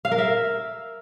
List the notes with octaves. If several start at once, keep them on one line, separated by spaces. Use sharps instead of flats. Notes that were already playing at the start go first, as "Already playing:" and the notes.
F5
A#4
E5